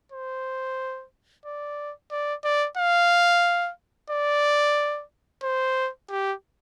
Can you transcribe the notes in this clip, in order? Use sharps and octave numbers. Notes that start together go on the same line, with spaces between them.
C5
D5
D5
D5
F5
D5
C5
G4